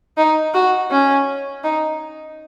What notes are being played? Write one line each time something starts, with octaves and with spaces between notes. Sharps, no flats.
D#4
F#4
C#4
D#4